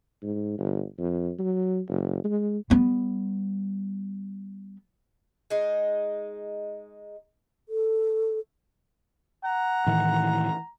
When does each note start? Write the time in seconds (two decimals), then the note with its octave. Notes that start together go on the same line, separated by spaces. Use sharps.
0.22 G#2
0.58 G1
0.99 F2
1.39 F#3
1.89 F#1
2.24 G#3
2.70 G3 B3
5.50 G#3 D#4
7.69 A4
9.45 F#5 A#5
9.86 A2 D#3 E3